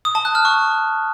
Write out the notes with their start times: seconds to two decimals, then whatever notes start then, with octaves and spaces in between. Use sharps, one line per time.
0.05 D#6
0.15 A5
0.25 F#6
0.35 F6
0.45 C#6